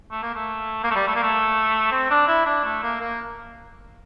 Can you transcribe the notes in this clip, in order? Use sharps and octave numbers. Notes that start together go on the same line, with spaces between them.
A3
A#3
A3
A#3
A3
G3
A3
A#3
A3
C4
D4
E4
D4
A3
A#3
A#3